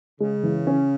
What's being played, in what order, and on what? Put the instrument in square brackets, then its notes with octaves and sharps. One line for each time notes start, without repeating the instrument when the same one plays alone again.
[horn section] C#3 [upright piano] G#3
[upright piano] E3
C#4